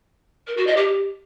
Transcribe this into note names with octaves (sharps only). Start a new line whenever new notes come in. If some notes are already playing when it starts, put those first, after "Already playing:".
A#4
F#4
D#5
G4